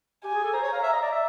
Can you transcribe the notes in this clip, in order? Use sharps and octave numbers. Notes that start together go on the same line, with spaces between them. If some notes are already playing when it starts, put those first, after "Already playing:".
G4 G#5
G#4
A4
C5 A#5
C#5
F5
E5
D#5
D5
E5